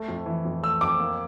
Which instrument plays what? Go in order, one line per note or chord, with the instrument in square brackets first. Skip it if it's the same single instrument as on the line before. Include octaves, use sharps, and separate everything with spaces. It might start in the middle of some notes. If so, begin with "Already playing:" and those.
Already playing: [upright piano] A3
F2
E3
F2
[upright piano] A3 [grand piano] E6
[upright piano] F2 [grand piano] D6
[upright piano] A#3